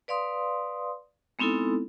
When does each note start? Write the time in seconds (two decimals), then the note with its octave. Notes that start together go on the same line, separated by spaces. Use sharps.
0.08 B4 D5 F5 C6 D#6
1.39 G#3 B3 C4 D#4 E4 A4